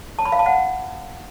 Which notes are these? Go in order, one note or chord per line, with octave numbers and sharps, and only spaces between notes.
A5
B5
F5
A5
F#5